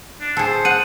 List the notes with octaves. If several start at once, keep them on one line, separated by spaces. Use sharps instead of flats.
D4
G#4 A4 C5
F#5 D#7